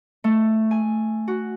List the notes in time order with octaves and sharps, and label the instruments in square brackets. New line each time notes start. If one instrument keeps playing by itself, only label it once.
[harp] A3
G#5
F#4